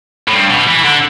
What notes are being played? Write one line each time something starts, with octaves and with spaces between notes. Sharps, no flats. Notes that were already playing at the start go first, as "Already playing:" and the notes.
A2
G2
B2
E3
D3